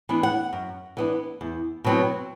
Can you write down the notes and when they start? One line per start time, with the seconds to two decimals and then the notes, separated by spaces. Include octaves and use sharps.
0.09 E3 B3 D4
0.23 F#5
0.53 F#2
0.97 E3 B3 D4
1.41 E2
1.84 B2 F#3 C4 E4